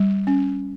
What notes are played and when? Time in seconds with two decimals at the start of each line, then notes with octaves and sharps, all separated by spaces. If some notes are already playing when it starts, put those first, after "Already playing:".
Already playing: G3
0.27 C#4